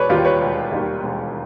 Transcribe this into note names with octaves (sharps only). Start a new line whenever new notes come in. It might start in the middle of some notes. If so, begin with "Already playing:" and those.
Already playing: E1 B4 C#5 D5
D#2 D#3 G3 F4 G4
B4 C#5
E1
D#2 D#3 G3
E1